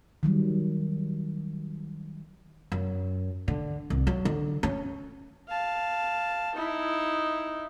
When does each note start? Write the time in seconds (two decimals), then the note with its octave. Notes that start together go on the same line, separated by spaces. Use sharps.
0.23 D#3 F#3 G3
2.72 F#2
3.48 D3
3.90 C2
4.07 F#3
4.25 D3
4.63 C#4
5.49 F5 A5
6.55 D#4 E4